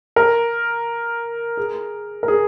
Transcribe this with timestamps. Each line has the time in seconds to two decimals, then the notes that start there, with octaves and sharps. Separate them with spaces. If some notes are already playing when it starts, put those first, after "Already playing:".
0.16 A#4
1.57 G#4
2.23 A#4
2.28 G#4